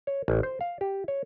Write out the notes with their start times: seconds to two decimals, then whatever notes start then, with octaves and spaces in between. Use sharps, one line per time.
0.07 C#5
0.28 A1
0.43 C5
0.61 F5
0.81 G4
1.08 C#5